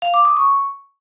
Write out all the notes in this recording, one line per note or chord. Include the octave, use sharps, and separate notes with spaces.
F5
D6
D#6
C#6